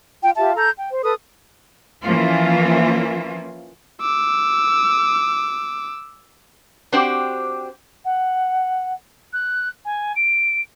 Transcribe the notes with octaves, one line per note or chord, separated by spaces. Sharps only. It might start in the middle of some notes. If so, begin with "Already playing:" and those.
F4 G5
F4 G4 E5 A5
A4 A#5 G6
G5
C5
A4 B4 D#6
E3 F3 A#3 C#4 F4
D6 E6
C4 D4 F#4 G4 C5 D5
F#5
F#6
G#5
D7